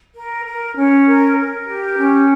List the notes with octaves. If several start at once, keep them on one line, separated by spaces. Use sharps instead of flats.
A#4
A#4
C#4
A#4
A#4
G4
C#4